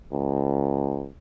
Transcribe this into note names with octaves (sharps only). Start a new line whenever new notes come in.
C#2